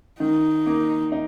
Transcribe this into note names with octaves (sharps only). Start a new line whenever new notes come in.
D#3 D#4
A#3
D#4